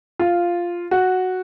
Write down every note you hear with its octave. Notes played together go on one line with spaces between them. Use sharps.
F4
F#4